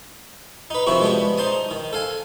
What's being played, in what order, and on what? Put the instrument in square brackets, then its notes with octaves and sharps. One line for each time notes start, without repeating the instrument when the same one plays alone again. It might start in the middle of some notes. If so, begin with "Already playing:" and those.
[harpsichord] D#4 B4
C3 D#3 F3 C4 E4 F#4
G#3 B3 D4 G4
D#4 C5 A5 D#6
D#3
A4 F5 G#5